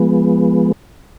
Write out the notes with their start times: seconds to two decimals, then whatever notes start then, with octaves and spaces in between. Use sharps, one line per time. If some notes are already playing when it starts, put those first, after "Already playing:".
Already playing: F3 G#3 B3